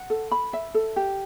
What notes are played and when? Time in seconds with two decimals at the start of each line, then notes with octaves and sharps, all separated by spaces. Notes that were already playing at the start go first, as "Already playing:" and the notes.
Already playing: F#5
0.10 A4
0.31 B5
0.53 E5
0.74 A4
0.96 G4